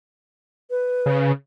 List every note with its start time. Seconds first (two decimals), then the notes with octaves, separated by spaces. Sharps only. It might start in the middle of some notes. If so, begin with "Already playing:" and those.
0.70 B4
1.06 C#3